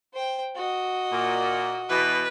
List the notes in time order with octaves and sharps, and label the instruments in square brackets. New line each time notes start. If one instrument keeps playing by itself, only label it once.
[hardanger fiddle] C5 G5
F#4 D#5
[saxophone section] A#2
[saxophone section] B2 E3 [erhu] B4